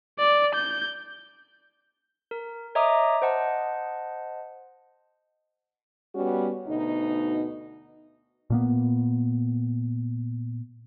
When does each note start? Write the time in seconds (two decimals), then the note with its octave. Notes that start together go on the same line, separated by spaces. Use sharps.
0.19 D5
0.55 G6
2.31 A#4
2.75 C#5 D#5 E5 A#5 D6 D#6
3.22 C5 D#5 F#5 A5
6.15 G3 B3 C#4 F#4
6.67 D2 B2 D#4
8.50 A#2 A#3 B3